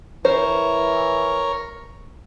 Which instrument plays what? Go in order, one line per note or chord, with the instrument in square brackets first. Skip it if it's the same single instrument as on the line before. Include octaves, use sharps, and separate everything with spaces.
[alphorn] E3 [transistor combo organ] A#4 C#5 [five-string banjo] C5